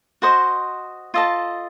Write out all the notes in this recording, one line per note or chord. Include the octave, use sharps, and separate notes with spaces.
F#4 C5 D#5
F4 A4 D#5 A5